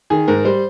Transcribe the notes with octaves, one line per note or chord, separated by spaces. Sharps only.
D#3 G#4
G#2 A#4
G3 C5